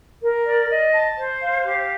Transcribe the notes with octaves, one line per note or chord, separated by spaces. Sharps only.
A#4
D5
D#5
A5
C5
F5
G4